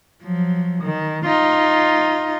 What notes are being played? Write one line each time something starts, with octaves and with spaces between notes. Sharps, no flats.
F3 F#3
D#3
D#4 F4